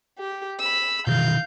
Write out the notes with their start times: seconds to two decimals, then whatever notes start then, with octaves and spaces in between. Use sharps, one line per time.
0.19 G4
0.60 B5 E6
1.07 B2 D#3 E3 F5 G6